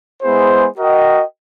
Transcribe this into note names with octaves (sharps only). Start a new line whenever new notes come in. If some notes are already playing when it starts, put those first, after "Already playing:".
G#3 B3 E4 G#4 C5
F#4 A#4 D#5 G5